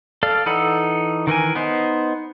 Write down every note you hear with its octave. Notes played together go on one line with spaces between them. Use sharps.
A4 D5 F5
E3 D#4 A4 F#5 B5
D#3 E3 A#4 G#5
B3 D#4 C5